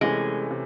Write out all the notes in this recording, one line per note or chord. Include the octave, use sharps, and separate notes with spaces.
C3 E3 G#3 A3 C#4
C3